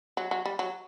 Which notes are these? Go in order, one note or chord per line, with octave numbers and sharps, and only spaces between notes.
F#3
F#3
G3
F#3